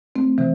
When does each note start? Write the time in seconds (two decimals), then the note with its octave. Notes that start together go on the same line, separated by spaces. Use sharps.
0.16 A3 C4
0.38 C3 E3